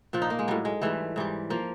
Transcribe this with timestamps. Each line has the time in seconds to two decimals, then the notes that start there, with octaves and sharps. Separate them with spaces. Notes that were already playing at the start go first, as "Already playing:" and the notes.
0.13 A#2 F3 D4
0.22 D#4
0.30 A#3
0.39 G#3
0.48 A2 F#3 G3
0.65 G#3
0.82 G#2 E3 G3 A3
1.16 G#2 E3 G3
1.50 F3 A#3